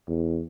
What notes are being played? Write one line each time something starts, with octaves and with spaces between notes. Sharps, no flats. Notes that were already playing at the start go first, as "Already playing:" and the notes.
E2